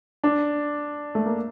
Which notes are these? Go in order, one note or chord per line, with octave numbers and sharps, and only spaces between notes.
D4
A3
A#3